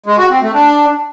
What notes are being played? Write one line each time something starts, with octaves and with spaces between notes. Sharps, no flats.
G#3
F#4
C4
A3
D4